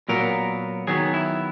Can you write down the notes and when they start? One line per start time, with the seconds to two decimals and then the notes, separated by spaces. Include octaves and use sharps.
0.09 A#2 F#3 B3 A#4
0.87 D#3 F#3 B3 G#4
1.14 E4